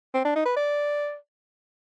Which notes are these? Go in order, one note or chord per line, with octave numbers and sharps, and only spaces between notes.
C4
D4
D#4
B4
D5